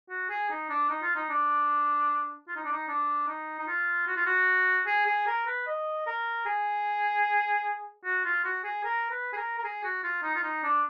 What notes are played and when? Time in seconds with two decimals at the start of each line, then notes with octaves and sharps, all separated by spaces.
0.10 F#4
0.30 G#4
0.50 D#4
0.70 D4
0.90 D#4
1.02 F4
1.16 D#4
1.29 D4
2.48 F4
2.56 D#4
2.64 D4
2.72 D#4
2.88 D4
3.28 D#4
3.59 D#4
3.68 F4
4.07 F#4
4.16 F4
4.26 F#4
4.87 G#4
5.06 G#4
5.27 A#4
5.47 B4
5.66 D#5
6.06 A#4
6.46 G#4
8.04 F#4
8.25 F4
8.44 F#4
8.64 G#4
8.84 A#4
9.11 B4
9.33 G#4
9.37 A#4
9.58 A#4
9.64 G#4
9.84 F#4
10.03 F4
10.23 D#4
10.35 F4
10.43 D#4
10.63 D4